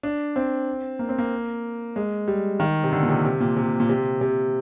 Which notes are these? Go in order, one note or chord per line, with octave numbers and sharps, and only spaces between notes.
D4
C4
A#3
C4
A#3
G#3
G3
D#3
C3
D3
A#2
C3
C3
A#2
C3
A#2
C3
C3